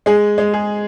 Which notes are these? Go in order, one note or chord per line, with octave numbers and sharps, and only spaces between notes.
G#3 G#4
G#3
G#4